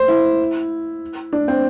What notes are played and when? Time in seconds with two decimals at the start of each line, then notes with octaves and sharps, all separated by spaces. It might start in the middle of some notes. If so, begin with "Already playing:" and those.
Already playing: C5
0.08 E4
1.33 D4
1.48 C4